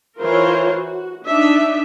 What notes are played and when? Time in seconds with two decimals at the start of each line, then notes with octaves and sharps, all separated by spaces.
0.19 E3 F4 A#4 C5 C#5
0.75 F#4
1.26 D4 D#4 E5